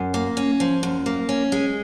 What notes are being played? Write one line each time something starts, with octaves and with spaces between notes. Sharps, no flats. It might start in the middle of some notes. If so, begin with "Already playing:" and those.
Already playing: F#2
A#3
C#4
F3
F#2
A#3
C#4
G#3